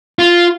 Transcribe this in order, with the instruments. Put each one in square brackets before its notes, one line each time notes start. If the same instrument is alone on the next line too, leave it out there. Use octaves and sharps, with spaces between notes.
[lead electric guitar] F4